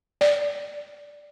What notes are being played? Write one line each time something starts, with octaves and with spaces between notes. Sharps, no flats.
D5